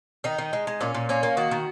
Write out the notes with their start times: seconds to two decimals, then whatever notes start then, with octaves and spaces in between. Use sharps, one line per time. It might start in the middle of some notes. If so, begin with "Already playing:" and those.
0.24 D#3 D#4
0.38 D#3
0.53 G#3
0.67 G#3
0.81 A#2 C#4
0.95 A#2
1.09 A#3 C#4
1.23 A#3
1.37 D#3 F#4
1.51 D#3